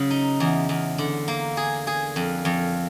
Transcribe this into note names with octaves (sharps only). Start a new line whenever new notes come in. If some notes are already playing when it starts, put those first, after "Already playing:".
Already playing: C#3 F#3
D#4
E2
E2
D3
A#3
G#4
G#4
F2
F2